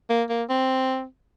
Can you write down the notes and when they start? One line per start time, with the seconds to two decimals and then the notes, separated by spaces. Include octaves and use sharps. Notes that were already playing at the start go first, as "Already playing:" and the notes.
0.10 A#3
0.30 A#3
0.50 C4